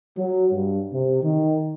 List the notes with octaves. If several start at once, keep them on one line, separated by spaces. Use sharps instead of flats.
F#3
G2
C3
D#3